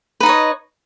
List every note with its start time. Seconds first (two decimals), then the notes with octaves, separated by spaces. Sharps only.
0.20 B4
0.23 D#4
0.26 D#5
0.29 C#5